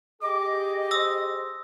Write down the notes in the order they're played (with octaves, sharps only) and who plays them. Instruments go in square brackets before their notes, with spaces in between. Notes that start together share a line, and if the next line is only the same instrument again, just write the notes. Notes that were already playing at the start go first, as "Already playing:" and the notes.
[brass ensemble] G4 G#4 [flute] D#5 [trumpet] D6
[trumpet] C5 [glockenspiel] D#6 E6 A#6